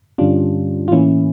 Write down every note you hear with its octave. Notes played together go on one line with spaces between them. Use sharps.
G2 D3 G3 C#4 D4 F4 G4
F4
A2 E3 A#3 C#4 E4